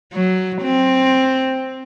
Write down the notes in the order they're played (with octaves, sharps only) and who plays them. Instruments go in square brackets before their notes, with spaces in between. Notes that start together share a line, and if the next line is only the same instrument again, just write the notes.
[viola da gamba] F#3
C4